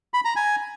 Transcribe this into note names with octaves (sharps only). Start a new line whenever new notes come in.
B5
A#5
G#5